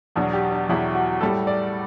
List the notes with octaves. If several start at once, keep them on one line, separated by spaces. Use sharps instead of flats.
E2 B2 F#3 D4
G4
D4
E2 B2 F#3 E4
F#4
A2 G3 A4
D5